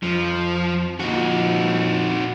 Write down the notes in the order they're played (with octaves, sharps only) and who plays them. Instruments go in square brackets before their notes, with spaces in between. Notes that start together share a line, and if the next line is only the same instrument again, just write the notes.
[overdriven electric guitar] F2 [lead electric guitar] F3
[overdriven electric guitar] F2 A#2 [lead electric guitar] D#4 F#4